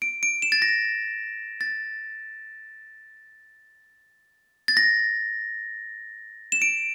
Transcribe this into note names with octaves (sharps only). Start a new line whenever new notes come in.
D7
D7
E7
A6
A#6
A6
A6
A#6
E7
D7